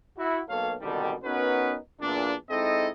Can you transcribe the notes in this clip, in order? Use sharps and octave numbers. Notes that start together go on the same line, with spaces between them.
E4 F#4
B1 F#3 A#3 A4 C#5 F5
C2 G#2 B2 D3 D#3 G3
B3 C#4 D#4 F#4 A#4 B4
E2 A#2 D4
G#3 C4 D#4 E4 A4 D#5